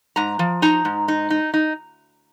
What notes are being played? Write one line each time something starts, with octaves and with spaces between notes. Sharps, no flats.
G#2 A#5
F3
D#4 A#5
G#2
D#4
D#4
D#4